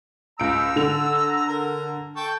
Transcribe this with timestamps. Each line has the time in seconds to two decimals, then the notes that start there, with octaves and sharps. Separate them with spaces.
0.40 C#2 A#5 E6 D7
0.76 D3 F7
1.48 A#4
2.16 A4 G5 C#6